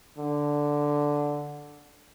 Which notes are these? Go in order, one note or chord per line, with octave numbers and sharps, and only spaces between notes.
D3